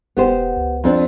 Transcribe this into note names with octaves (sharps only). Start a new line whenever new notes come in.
E1 B3 G4 C5
C#2
F2 C4 D4